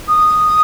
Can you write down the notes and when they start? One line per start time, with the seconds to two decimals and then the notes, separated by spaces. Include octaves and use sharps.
0.08 D#6